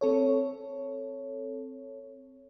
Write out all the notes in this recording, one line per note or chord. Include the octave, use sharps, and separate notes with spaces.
C4 A4 C#5